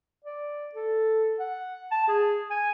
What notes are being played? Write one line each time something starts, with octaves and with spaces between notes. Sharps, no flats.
D5
A4
F#5
A5
G#4
G#5